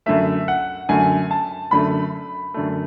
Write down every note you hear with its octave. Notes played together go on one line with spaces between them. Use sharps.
F#2 D3 A3 E5
F#5
F#2 D3 A3 G#5
A5
F#2 D3 A3 B5
F#2 D3 A3